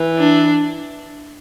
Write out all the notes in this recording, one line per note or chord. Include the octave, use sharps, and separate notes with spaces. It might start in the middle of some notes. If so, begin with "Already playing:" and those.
Already playing: E3
D4